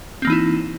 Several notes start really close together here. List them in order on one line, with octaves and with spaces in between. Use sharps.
C4 A#3 E3 D#4 E4